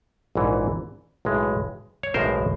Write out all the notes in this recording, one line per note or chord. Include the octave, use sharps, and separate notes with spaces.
A#1 G#2 E3
B1 A2 E3 G#3
C#5
B1 A2 E3 G#3 A#4 C5